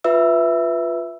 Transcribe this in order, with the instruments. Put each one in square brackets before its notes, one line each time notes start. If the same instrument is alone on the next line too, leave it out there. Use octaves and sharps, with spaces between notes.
[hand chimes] F4 B4 E5 E6